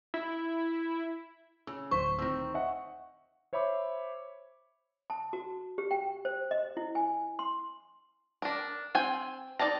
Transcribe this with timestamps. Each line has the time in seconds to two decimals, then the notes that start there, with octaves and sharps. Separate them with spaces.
0.14 E4
1.67 C#3 E6
1.91 D1 C5 C#6 B6
2.19 D#3 C4 E6 A#6
2.54 D#5 E5 F#5
3.53 C5 C#5 E5 B5 D6
5.10 A5
5.33 F#4
5.78 G4
5.91 G5
6.25 C5
6.51 D#5
6.77 E4
6.95 G#5
7.39 C6
8.42 D4 A#4
8.95 C4 G5 G#5
9.59 D#4 A4 D5 A5 A#5